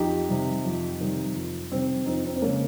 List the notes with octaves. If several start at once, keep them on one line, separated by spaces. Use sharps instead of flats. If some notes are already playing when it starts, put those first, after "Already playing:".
Already playing: F2 D#4 G4
C3 D#3 G3
F2
C3 D#3 G3
F2
C3 D#3 G3 C4
F2 C4 D#4
C4
C4
C#3 G#3 A#3 C#4